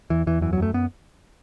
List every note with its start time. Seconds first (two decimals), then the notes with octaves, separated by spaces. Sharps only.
0.10 E2 E3
0.26 E2 E3
0.41 F#2 E3
0.53 F#3
0.58 F#2 A3
0.74 F#2 B3